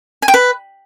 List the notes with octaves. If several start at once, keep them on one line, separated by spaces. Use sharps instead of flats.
G#5
G5
B4